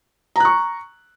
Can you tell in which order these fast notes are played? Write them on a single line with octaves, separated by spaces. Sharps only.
A#5 F#6 C#6